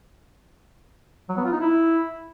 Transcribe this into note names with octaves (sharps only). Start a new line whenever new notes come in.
F#3
B3
F4
D#4
E4